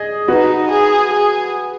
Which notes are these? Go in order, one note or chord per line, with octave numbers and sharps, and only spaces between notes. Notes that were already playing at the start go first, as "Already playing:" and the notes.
Already playing: G#4 D#5
D#4 F#4 B4
G#4
G#4